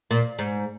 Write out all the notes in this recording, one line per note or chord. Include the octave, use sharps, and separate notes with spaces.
A#2
G#2